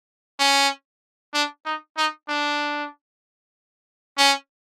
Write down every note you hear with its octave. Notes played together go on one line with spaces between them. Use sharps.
C#4
D4
D#4
D#4
D4
C#4